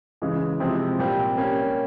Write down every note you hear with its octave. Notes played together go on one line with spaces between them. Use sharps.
C#3 E3 G#3
C3 F3 G#3 C4 E4
A#2 G3 C4
G3 A#3 C#4